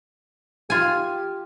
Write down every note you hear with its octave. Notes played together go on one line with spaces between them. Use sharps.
F4 G4 G#5